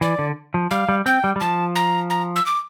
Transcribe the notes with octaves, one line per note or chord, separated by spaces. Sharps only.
E3 D5
D3
F3
G3 F5
G3
C4 G5
G3
G3
F3 A5
A#5
A#5
E6
D6